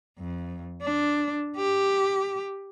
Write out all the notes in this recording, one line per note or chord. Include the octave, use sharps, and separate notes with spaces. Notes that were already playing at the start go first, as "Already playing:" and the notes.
F2
D4
G4